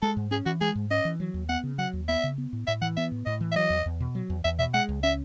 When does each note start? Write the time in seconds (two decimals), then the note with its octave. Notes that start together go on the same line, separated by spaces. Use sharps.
0.02 G#3 A4
0.17 G#2
0.31 C#4 G#4
0.46 E3 F#4
0.61 G#3 G#4
0.75 G#2
0.91 C#4 D#5
1.05 E3
1.20 F#3
1.34 D#2
1.49 B3 F#5
1.63 C#3
1.78 F#3 F#5
1.93 D#2
2.08 B3 E5
2.24 C#3
2.38 B3
2.53 A2
2.67 A2 E5
2.81 E3 F#5
2.97 B3 E5
3.12 A2
3.26 A2 D#5
3.41 E3
3.52 E5
3.56 F#3 D#5
3.70 E2
3.86 E2
4.00 B2
4.15 F#3
4.30 E2
4.45 E2 E5
4.59 B2 E5
4.74 G#3 F#5
4.89 C#2
5.03 C#4 E5